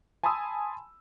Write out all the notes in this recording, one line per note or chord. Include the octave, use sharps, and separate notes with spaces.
G#5 A5 B5 C6 D#6 E6